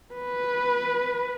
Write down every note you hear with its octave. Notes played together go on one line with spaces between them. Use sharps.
B4